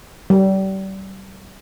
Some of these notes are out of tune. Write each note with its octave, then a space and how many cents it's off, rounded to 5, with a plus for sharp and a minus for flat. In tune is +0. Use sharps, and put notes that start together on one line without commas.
G3 -30